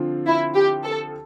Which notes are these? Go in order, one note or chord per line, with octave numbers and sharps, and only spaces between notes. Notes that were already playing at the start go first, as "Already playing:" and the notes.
Already playing: D3 F3 C4 F4
E4
G4
A4